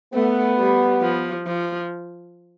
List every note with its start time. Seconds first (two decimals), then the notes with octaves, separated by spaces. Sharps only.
0.14 A3 B3
0.57 G3
1.01 F3
1.46 F3